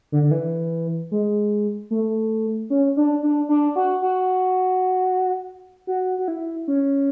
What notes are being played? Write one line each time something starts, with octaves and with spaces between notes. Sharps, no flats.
D3
D3
E3
G#3
A3
C#4
D4
D4
D4
F#4
F#4
F#4
F#4
E4
C#4